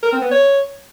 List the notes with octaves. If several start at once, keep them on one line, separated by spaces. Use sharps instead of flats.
A#4
C4
B3
C#5